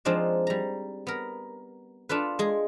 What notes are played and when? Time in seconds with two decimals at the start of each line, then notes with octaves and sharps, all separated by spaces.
0.05 F3 G#3 C4 D4 D#4
0.47 G3 A#5
1.07 B3 A#4
2.09 D4 F4 A4 B4
2.39 G#3 G#4